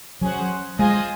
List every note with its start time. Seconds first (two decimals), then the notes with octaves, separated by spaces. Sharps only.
0.21 F#3 C#4 G#4 C5 F#5
0.79 G#3 F4 G#4 C5 D#5 G#5